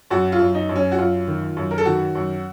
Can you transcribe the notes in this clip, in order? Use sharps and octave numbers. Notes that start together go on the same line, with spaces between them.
F#2 F#4
F4
F#2
D#4
F#2
C#4
F#4
F#2 F4
D#3
F#2
A#4
A4
D#3 F#4
F#2